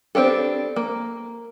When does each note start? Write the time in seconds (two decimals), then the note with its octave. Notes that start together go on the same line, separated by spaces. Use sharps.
0.15 B3 C4 D4 G4 A4
0.76 A#3